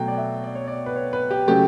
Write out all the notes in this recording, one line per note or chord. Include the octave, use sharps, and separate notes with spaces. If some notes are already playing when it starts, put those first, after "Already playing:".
Already playing: B2 F#3 A3 G5
D5
E5
D5
C#5
D5
B4
C#5
B4
G4
C#3 F#3 A3 G4